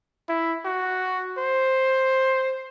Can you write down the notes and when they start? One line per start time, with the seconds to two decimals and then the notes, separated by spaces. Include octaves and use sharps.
0.29 E4
0.65 F#4
1.38 C5